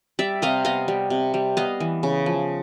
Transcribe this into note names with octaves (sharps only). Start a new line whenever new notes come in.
G3 D5 E5
C3 D#5 F5
B3 D#5 F5
G3
C3
G3
B3 D#5 F5
E3
C#3
F3